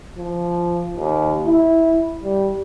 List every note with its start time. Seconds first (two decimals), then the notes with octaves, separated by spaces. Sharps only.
0.18 F3
0.97 D#2
1.46 E4
2.24 G3